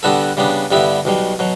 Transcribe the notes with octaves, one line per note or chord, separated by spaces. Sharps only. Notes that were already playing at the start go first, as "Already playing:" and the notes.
D3 G3 B3 F#4 A4
C#3 G3 B3 D4
G2 D3 G3 B3 E4
B1 B2 G3
B2 F#3